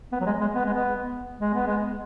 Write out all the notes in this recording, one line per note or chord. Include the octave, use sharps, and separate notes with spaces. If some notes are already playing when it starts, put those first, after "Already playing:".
B3
F#3
G#3
G#3
B3
G#3
B3
G#3
B3
G#3